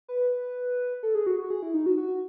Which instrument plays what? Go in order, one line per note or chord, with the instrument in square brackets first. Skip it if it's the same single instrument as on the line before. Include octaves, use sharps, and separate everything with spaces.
[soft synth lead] B4
A4
G#4
F#4
F#4
G#4
E4
D#4
F#4
F#4